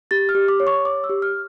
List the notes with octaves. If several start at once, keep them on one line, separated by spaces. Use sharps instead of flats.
G4 A6
F6
G4
D6
C#5
C#6
C#5 D6
E6
G4
F6